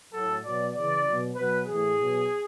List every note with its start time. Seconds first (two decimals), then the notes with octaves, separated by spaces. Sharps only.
0.13 A2 F#3 A4
0.44 B2 F#3 D5
0.75 C#3 E3 D5
1.06 B2 F#3
1.36 B2 F#3 B4
1.67 A2 E3 G#4
1.98 B2 F#3